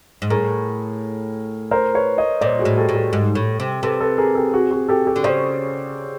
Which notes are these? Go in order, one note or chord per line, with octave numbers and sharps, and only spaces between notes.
G#2
A2 G#4 A#4
A#4 C5
B4 C#5
C#5 D#5
A#2 C5 D5
F#4 G#4
A2
G4 A4
A2
G4 A4
G#2
A2
C3
C3 A4 B4
A4 B4
G#4 A#4
G4 A4
F#4 G#4
F#4 G#4
G4 A4
G4 A4
D3
C#3 C5 D5